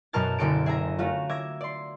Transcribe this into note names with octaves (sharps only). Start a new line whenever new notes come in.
F#2 B2 A#4 A5 F6 A6
F#1 F#2 D3 A4 A6 D7
G#4 E5 G#5 A#5
A3 C#4 F4 F#4
E5 D6 G#6 A#6
D5 C6